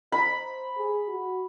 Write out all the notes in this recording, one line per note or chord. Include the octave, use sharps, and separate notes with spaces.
C5 B5
G#4
F#4